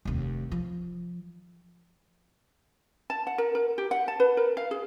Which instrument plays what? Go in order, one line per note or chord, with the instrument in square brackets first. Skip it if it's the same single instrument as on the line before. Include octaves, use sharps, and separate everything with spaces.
[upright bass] F1 D#2
F3
[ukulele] A5
F#5
A#4
A#4
G4
F#5
A5
B4
A#4
F5
G#4